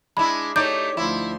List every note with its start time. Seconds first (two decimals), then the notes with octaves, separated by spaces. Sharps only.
0.17 G#3 D4 E4 B5
0.56 A3 D#4 G4 C#5 D5 G6
0.97 D2 F3 E4 C6